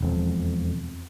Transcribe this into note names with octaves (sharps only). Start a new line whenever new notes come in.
E1 F2